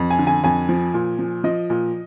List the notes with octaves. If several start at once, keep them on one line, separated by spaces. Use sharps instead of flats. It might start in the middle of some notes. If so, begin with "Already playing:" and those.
Already playing: F2
G#5
D3
G#5
F2 G#5
F3
A#2
F3
F3 D#5
A#2